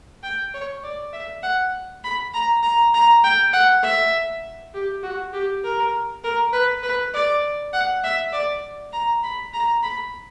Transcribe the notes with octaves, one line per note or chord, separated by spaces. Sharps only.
G5
C#5
D5
E5
F#5
B5
A#5
A#5
A#5
G5
F#5
E5
G4
F#4
G4
A#4
A#4
B4
B4
D5
F#5
E5
D5
A#5
B5
A#5
B5